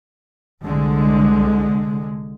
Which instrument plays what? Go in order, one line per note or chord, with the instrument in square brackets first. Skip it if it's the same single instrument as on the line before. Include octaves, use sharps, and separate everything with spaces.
[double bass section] C2 D3 G#3